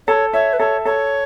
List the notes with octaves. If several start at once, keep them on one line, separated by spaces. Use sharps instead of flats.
A4 C#5
C#5 E5
B4
A4 C#5
A4 C#5